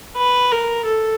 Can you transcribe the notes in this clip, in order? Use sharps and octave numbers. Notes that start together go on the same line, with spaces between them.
B4
A#4
A4